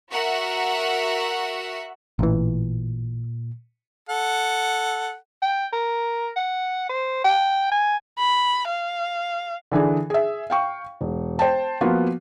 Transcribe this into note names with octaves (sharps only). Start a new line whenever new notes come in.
F#4 A#4 E5 F#5
A1 A#2 E3
A4 F#5
G5
A#4
F#5
C5
G5
G#5
B5
F5
D3 E3 D4 G#4
G#4 E5
F5 G5 C#6
E1
C5 G5 A5
F3 A#3 B3 F4 F#4